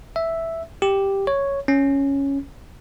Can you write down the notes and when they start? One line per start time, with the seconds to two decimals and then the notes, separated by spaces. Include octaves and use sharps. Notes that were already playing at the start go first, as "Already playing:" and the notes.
0.16 E5
0.82 G4
1.27 C#5
1.68 C#4